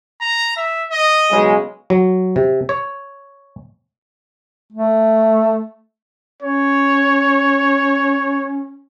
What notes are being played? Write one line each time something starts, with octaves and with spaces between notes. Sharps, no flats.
A#5
E5
D#5
B1 C#3 G#3
F#3
C3
C#5
A3
C#4 C#5